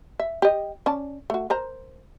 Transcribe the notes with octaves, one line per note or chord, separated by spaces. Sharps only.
E5
G4 D#5
C#4 D5 A5
A3 F#4
A#4 C5 A#5